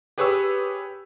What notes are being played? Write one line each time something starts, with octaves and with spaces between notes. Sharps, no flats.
G4 G#4 B4 C#5 C#6 E6